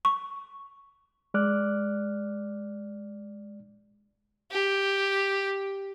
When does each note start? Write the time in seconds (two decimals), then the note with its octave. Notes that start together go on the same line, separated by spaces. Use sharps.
0.05 C#6
1.34 G#3 D5 D6 F6 F#6
4.51 G4